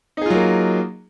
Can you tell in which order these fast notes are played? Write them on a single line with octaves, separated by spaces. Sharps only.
D#4 G#4 F4 F#3 A#3